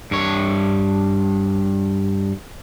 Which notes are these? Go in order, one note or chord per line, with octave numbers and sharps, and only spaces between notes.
G2 C#5